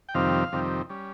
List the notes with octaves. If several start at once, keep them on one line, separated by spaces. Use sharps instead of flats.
G5
F2 C3 D#3 G3 C4 F5
F2 C3 D#3 G3 C4
G3 C#4